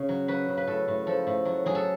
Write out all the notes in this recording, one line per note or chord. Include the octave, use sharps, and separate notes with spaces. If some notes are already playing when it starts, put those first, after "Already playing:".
Already playing: C#3
F#3
F#3 B4
C#3
B4
A2 A4
A2
F3 A4
A2
F#3
F#3 G#4
A4